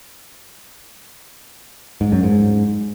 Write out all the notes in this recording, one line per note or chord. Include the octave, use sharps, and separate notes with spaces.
G#2
F#2
G#2